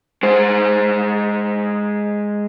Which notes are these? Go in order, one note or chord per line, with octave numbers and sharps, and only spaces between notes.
G#3 C5